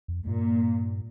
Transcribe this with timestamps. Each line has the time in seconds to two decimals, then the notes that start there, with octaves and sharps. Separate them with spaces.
0.08 F2
0.27 G2 A#2